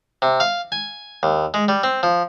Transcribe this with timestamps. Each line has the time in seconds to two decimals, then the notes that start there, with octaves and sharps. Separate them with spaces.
0.22 C3
0.40 F5
0.72 G#5
1.23 D#2
1.54 G#3
1.68 G3
1.83 C4
2.03 F3